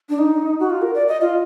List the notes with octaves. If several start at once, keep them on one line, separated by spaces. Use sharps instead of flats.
D4
D#4
F#4
F4
A#4
D5
D#5
F4